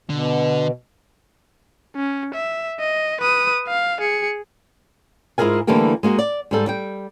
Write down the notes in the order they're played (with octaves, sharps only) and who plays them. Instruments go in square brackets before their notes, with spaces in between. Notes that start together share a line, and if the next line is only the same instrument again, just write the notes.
[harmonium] B2 [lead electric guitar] D3
[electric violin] C#4
E5
D#5
B4 D#6
F5
G#4 C#7
[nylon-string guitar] G#2 E4 F4 G#4 A#4 G#5
D3 E3 G3 A3 A#3 G4
G#3 A#3 F#4
D5
G#2 G3 A4
G3 G5